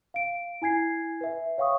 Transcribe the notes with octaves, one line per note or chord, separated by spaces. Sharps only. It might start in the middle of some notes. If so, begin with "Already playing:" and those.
F5 D7
E4 G#5 G#6 C7
B4 E5
C#5 F5 G5 C#6 D#6